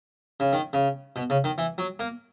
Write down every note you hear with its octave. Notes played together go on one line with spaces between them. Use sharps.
C#3
D#3
C#3
B2
C#3
D#3
E3
F#3
A#3